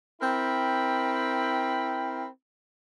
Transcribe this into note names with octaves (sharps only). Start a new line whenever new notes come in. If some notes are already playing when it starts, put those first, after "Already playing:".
C4 E4 A#4 G5 B5